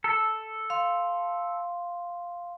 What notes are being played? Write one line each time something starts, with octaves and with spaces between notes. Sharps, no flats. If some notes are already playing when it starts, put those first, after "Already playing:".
A4
F5 C6